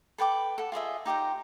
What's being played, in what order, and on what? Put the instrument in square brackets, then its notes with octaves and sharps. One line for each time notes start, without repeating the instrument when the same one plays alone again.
[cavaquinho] A4 B4 G5 D6
A4 F#5
F4 G#4 D#5 E5
D#4 G4 C5 A#5